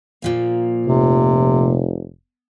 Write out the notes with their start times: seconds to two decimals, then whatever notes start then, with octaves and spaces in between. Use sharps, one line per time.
0.22 A#2 F3 A#3
0.86 F1 C3